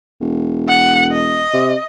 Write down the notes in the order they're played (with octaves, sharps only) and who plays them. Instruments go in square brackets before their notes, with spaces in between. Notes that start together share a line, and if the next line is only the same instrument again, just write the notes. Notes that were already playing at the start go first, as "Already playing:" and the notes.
[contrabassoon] E1
[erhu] F#5
D#5
[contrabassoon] C3